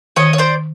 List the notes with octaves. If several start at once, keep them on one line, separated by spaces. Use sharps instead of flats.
D#3 C#5 D#5
C#5
C5 D5